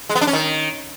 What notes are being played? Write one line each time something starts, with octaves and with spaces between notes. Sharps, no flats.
G#3
B3
D4
C#4
D#3